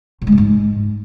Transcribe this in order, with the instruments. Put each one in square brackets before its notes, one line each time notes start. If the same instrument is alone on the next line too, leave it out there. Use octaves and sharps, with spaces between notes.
[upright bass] A2
G#3
A#2
G#2